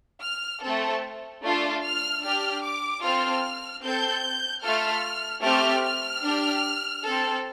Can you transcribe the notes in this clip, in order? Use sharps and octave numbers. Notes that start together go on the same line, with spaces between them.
F6
A3 C4 A4
A3 D4 F4 A4 D5
F6
D4 G4 F6
D6
C4 F4 A4 F6
C4 A4 G6
A3 F4 A4 F6
A3 C4 G4 F6
F6
D4 G4
C4 A4